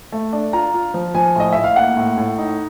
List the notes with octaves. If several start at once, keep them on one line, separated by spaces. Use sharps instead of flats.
A3
D4
F4 A#5
F4
F3
F3 G#5
A2 D#5
A2 E5
F5
A#3 F#5
A2
A2
D#4